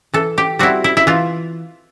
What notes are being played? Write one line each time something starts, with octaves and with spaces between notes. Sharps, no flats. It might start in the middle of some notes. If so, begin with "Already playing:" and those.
E3 A4
G4
G3 C4 E4 F#4
E4
E4
E3 F4